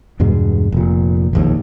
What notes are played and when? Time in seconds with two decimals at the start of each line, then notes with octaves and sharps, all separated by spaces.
0.20 E2 G2 B2 G#3
0.72 F1 A#2
1.33 E1 A#1 D#2